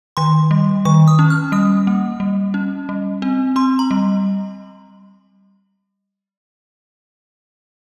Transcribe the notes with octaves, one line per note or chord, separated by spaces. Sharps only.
D#3 C6
G3
D#3 C#6
D#6
C#4
F6
G3 D#6
A#3
G3
C#4
G3
C4
C4 C6
A#5
G3